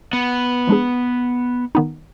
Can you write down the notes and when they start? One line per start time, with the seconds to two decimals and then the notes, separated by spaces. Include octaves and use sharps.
0.13 B3
0.67 F3 G#3 D4 G#4
1.75 D#3 B3 D#4